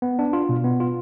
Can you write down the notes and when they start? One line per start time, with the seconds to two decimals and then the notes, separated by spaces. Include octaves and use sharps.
0.02 B3
0.19 D4
0.33 F4
0.49 B2
0.64 B3
0.80 F4